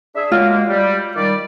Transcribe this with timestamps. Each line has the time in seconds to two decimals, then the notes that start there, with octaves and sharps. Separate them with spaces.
0.15 D4 G#4 E5
0.31 F#3 G#3 A#3 F4
0.68 G3
1.16 D#3 G3 D5